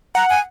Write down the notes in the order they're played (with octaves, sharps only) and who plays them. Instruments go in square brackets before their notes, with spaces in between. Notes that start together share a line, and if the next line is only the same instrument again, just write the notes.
[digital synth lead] F#5 [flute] A#5
[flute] G#5